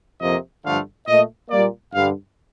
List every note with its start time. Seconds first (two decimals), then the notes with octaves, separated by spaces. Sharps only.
0.20 F2 C3 F3 A#3 D#5
0.64 G2 D3 F3 A3 F5
1.08 A#2 A3 D#5
1.50 A#2 G3 A#3 D5
1.94 G2 D3 G3 F5